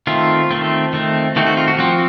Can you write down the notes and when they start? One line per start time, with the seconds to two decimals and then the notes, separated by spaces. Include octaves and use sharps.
0.07 D#3 A3 C4 F4
0.51 D#3 A3 C4
0.93 D#3 A3 C4
1.36 D#3 A3 C4 F#4
1.46 F#4
1.57 F4
1.68 F#4
1.78 F3 C4 F#4